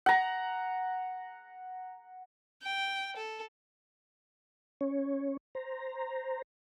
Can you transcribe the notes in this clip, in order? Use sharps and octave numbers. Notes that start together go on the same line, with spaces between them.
F#5 A#5
G5
A4
C#4 C#5
C5 A#5